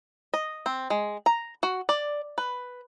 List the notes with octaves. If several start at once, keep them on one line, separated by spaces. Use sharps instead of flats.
D#5
C4
G#3
A#5
F#4
D5
B4